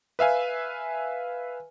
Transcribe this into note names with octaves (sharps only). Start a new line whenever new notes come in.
B4 E5 F5 G#5